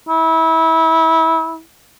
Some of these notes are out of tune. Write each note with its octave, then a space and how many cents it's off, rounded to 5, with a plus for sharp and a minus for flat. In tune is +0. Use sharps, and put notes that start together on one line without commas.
E4 -25